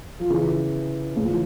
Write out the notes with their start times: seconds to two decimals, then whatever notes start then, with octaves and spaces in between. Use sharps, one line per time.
0.20 F3
0.30 C#3 E3
1.16 A2 C#3
1.23 F3
1.29 E3